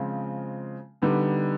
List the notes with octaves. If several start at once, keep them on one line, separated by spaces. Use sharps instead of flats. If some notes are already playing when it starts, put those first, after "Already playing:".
Already playing: C#3 F3 G#3 C4 F4
D3 G3 B3 D#4